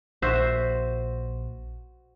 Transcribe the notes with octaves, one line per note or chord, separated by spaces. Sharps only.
A#1 F#4 C5 E5